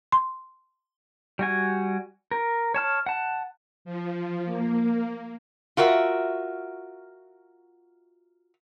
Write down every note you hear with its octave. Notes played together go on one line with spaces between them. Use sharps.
C6
G3 F#4 G#5
A#4
C#5 A5 F6
F#5 A5
F3
A#3
F4 F#4 A#4 E5